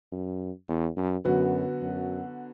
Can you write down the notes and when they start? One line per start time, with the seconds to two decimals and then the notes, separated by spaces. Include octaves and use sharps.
0.12 F#2
0.68 E2
0.97 F#2
1.25 F#2 D3 F#3 B3 F#4 B4
1.82 F#2